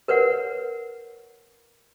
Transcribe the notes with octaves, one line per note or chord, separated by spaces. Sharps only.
A#4 B4 C#5 F#5